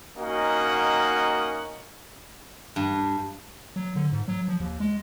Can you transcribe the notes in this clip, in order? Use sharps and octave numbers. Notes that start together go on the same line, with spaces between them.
A#3 C#4 D#4 F#4 D#5 F#5
G2
F#3
D3
G#2
F#3
F3
D#2
G#3